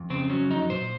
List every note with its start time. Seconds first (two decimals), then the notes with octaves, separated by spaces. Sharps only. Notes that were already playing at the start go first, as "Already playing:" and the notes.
Already playing: F2
0.10 C#3 C4
0.30 F#3 C#4
0.50 F2 D#4
0.70 A#2 C5